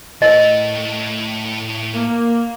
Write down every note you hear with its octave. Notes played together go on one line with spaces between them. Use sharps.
A2 A3 A#4 D#5
A#3